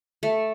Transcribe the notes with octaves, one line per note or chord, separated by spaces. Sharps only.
A3